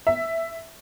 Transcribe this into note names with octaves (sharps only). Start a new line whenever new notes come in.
E5